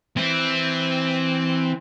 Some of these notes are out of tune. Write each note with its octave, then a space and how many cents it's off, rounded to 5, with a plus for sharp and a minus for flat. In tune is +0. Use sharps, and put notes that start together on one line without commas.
E3 +0 C4 +0